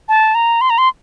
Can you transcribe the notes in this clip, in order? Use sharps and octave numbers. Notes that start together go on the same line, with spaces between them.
A5
A#5
C6
A#5
C6